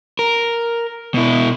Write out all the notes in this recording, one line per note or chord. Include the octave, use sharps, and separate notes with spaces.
A#4
B2 E4